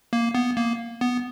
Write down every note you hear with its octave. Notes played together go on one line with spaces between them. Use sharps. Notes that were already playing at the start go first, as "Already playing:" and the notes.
A#3
B3
A#3
B3